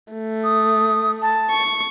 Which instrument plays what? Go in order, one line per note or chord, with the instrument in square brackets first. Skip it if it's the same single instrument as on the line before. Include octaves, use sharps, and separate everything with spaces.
[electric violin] A3
[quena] D#6
A5
[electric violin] C#6